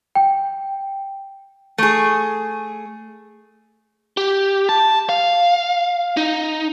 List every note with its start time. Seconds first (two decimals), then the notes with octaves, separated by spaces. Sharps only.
0.15 G5
1.78 A3 G#4
4.17 G4
4.69 A5
5.09 F5
6.17 D#4